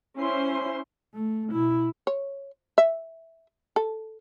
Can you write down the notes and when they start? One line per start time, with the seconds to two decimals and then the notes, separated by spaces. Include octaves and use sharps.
0.17 C#4 E4 C5 C6
1.14 A3
1.52 B2 E4
2.07 C#5
2.78 E5
3.76 A4